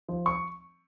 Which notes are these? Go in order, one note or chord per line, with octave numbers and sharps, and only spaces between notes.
F3
C#6